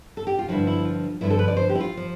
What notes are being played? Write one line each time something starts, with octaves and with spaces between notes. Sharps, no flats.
A4
G4
F4
G2 D3 F3 E4
E4
F4
G2 D3 F3 E4
A4
B4
D5
C5
G4
E4
F4
F3